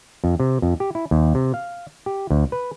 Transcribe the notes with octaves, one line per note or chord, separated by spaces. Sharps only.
F2
C3
F2
G4
E4
D#2
C3
F5
G4
D2
B4